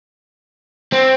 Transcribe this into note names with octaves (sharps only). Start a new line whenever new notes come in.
C4